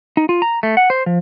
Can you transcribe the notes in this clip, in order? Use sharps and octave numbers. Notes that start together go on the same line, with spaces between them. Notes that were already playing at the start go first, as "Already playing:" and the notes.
D#4
F4
A#5
A3
F#5
C5
F3